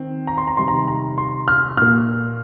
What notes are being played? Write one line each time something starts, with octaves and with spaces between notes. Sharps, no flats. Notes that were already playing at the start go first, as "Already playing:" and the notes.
Already playing: D#3 C4
A#5
C6
A#5
C3 D#3 G3 C6
A#5
A#5
C6
F6
A#2 A#3 F6